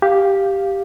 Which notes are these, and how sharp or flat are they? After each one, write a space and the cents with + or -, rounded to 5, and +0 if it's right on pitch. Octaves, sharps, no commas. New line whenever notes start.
G4 +0 F5 +0